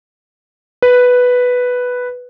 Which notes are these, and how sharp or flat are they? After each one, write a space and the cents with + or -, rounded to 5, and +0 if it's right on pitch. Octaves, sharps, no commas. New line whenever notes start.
B4 +0